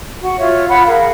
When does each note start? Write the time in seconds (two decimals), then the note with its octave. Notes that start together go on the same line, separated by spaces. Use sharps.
0.20 F#4
0.38 F4 C#5 E5
0.68 F4 F#5 B5
0.86 G#4 A#4 F5 F#5